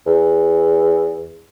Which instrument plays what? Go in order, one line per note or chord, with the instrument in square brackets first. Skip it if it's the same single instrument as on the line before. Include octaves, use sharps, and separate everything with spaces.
[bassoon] E2